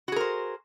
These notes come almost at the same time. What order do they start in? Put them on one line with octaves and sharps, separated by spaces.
F#4 G#4 A#4 C5